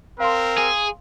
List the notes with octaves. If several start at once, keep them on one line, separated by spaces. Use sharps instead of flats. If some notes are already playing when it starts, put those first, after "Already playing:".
C4 A#4 F5 C6
G#4